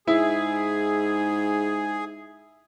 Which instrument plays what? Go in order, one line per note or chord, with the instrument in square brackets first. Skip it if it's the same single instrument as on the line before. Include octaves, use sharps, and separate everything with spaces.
[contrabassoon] G#2 [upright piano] E4 [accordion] G#4